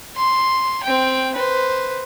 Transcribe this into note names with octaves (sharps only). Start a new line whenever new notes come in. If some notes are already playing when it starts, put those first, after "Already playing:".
C6
C4 G5
B4 C5